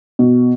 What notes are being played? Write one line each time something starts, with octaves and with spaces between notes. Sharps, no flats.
B2